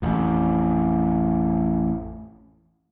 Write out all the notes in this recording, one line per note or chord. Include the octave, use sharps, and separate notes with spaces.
A1 F2